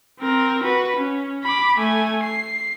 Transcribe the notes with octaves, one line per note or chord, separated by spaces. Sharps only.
C4 A#4
F#4 B4
C#4
B5 D6
A3 G#5
C7